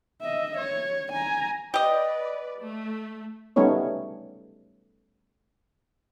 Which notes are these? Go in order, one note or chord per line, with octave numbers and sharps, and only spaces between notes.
D#5 E5
C#5
G#5 A#5
G4 B4 D5 D#5
A3
G3 A3 B3 C#4 D#4 C#5